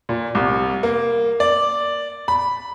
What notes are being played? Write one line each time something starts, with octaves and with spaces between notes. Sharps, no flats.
A#2
C2
A#3
D5
B5